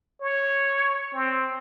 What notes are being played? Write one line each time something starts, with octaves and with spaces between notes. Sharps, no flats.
C#5
C4